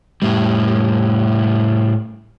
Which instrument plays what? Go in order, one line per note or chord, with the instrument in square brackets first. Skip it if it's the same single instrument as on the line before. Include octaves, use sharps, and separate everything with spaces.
[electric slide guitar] A2 G3